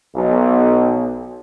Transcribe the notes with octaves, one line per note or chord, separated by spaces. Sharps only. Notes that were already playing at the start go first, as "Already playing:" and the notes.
B1